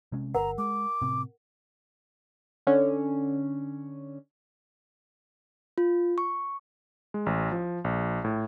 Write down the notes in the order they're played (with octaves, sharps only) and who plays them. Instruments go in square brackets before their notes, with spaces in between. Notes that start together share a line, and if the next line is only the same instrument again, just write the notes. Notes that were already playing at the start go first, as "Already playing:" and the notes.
[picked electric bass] C3 G#3 C#4
[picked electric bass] G1 [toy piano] A#4 F#5 [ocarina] A#5
[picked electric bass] G#3 [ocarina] D6
[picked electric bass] A2 C3 C4
[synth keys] D3 C#4
[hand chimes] F4
C#6
[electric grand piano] G#3
A1
F3
A#1
A2